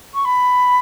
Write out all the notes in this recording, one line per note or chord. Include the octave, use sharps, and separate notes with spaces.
C#6
B5